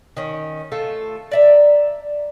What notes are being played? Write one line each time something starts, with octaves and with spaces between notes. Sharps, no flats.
D#3 C#4
A3 F4 A4
D5 E5 A#5